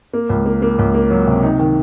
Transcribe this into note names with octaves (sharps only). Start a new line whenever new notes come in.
A#3
C#2
A#3
A#3
C#2
A#3
F#3
C3
D#4
D#3